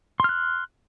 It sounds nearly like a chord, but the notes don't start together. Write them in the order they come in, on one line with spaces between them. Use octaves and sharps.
C6 F6 F#6